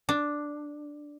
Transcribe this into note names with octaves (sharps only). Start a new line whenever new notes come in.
D4